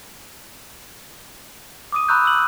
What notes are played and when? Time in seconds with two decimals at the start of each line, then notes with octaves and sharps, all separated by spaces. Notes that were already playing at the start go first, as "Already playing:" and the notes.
1.92 D6 D#6 D#7
2.09 A#5 B5 C#6 E6 F#6 G6
2.25 E6 F#7